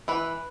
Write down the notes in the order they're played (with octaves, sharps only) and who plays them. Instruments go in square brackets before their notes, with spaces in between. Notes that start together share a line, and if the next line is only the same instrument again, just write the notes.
[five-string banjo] E3 B4